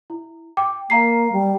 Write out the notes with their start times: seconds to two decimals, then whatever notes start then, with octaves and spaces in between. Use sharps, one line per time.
0.10 E4
0.57 G5 D6
0.90 A#3 F5 A#5 C7
1.32 G3